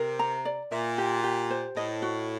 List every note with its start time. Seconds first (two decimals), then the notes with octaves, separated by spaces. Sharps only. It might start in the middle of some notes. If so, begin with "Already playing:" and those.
Already playing: C3 A#4
0.19 A#5
0.45 D5
0.72 A#2 E5
0.98 G4
1.24 G4
1.51 C5
1.76 A2 D#5
2.02 F#4